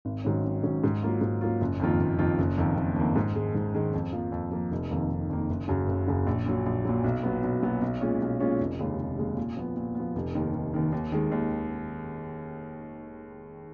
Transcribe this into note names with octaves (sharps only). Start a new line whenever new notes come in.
G#1
G#2 D#3 F#3 C#4
G#1
G#2 D#3 F#3 C#4
G#2
F#3 A#3 F4
G#2
F#3 A#3 F4
F#1
F2 D#3 A#3 F4
F#1
F2 D#3 A#3 F4
F#1
F2 D#3 A#3
F#1
F2 D#3 A#3
G#2
D#3 G#3
G#2
D#3 G#3
F2
F3 A#3
F2
F3 A#3
F1
F2 D#3 A#3
F1
F2 D#3 A#3
F#1
F#2 C#3 F#3
F#1
F#2 C#3 F#3
A#1
A#2 F#3
A#1
A#2 F#3
B1
A#2 F#3 B3
B1
A#2 F#3 B3
B1
A#2 G#3 C#4 F4
B1
A#2 G#3 C#4 F4
F1
D#2 C#3 G#3
F1
D#2 C#3 G#3
A#2
F3 B3
A#2
F3 B3
F1
D#2 D#3
F1
D#2 D#3
D#2
D#3 G#3
D#2